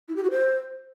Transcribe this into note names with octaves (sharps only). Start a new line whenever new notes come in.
E4
G4
F#4
C5